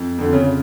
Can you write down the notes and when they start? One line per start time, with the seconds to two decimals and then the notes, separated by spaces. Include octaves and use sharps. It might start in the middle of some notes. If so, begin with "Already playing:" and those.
Already playing: F2
0.18 F2 D3
0.33 C#3